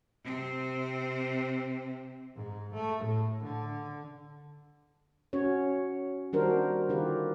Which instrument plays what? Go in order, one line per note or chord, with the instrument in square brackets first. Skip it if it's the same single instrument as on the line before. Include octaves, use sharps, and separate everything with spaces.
[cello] C3 C4
[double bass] G#2
A3
A2
D3
[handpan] C#4 F#4 C#5
D#3 G3 D4 F#4 A#4 C5
D3 D#3 F4 G4 B4